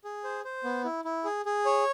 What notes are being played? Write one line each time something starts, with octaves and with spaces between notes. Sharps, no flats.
G#4
C5
C5
B3
E4
E4
G#4
G#4
C#5